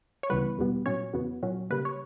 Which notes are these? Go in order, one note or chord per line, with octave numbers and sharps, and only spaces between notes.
C#5
C#2 C#3 E3 G3 B3 B4
E2 B2 G3 B3
A#2 F#3 C#4 C#5
E2 C#3 F#3 B3
A#2 F#3 C#4
C#3 G3 A#3 B4
C#5